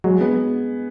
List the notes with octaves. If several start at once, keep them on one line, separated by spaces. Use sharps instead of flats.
F#3 G#3
B3